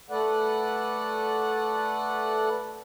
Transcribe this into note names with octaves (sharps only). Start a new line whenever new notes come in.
A3 A4 B4 D5 F#5